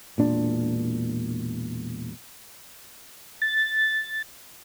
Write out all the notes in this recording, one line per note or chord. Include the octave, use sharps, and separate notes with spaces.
E1 A#2 D4
A6